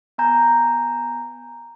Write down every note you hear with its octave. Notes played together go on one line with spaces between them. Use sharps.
B3 G#5 A#5 G6